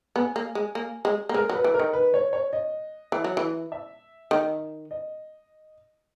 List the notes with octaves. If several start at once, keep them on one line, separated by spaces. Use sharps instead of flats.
B3 G#5
A#3
G#3
A#3
G#3
A#3
G#3 A#4
F#3
B4
E3
A#4
D#3
B4
C#5
C#5
D#5
E3
F#3
E3
E5
D#3
D#5